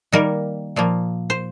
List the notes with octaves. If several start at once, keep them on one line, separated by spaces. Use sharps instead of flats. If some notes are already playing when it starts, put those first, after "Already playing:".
D#3 G3 A#3 A#4
A#2 F3 A#3
C5